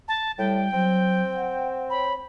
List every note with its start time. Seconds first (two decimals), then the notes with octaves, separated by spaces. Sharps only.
0.08 A5
0.38 A2 G3 G5
0.73 F#3 C4
1.35 F#5
1.90 C#5 B5